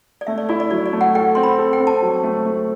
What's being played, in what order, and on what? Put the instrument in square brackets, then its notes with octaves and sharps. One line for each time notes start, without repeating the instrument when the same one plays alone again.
[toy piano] D5
[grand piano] A3 [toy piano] E5
[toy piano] D5
[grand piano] E4 [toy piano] D5
[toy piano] D5
[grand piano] F#3 [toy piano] D5
[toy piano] D5
[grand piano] A3
[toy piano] F#5
[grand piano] A4 [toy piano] G5
[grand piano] C4 [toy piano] C6
[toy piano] B5
[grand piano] A4
[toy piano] G5
[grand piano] C4
[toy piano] A5
[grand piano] F#3
A3
A3